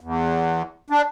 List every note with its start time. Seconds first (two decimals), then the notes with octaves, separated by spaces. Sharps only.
0.01 E2
0.90 D4